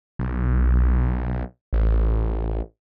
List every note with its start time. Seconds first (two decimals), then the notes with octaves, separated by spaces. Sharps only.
0.19 B1
1.73 A1